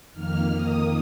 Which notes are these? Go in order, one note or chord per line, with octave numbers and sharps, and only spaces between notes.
F2 D#3 A#3 F6
D#6